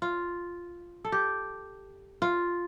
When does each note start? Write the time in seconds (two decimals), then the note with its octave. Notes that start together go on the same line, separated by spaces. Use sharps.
0.02 F4
1.05 A4
1.12 G4
2.22 F4